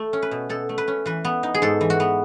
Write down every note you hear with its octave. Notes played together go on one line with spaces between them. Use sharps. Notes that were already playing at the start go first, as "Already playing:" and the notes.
Already playing: A3
C#4
B4
B2
B2 A4
A3
B4
C#4
E3 B4
B3
D#4
G#4
G#2 A4
E3
F#4
B3